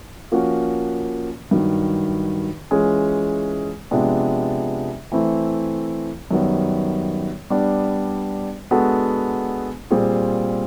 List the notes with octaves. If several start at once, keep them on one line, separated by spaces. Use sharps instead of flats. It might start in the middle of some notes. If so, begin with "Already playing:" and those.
F3 A#3 C#4 F#4
G2 D#3 F#3
E3 G#3 C#4 F4 G#4
C3 F3 G#3 B3 D4
E3 A3 C4 E4
F#2 D#3 G3 B3
G3 B3 D4
G#3 B3 D4 F#4 A4
A#2 G3 C4 F4 G#4